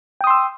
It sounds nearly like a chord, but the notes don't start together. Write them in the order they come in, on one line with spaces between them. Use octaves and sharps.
G5 D#6 C6 E6